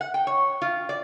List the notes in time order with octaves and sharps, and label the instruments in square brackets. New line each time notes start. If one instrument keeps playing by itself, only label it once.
[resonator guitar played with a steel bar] F#5
G5
C#5
F4
D5